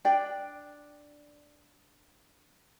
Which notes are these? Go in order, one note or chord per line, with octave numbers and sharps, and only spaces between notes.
D4 D5 G5